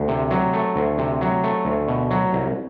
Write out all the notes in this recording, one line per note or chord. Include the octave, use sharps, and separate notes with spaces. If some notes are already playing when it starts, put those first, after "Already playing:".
Already playing: D2
C3
F#3
A3
D2
C3
F#3
A3
D2
B2
F#3
C2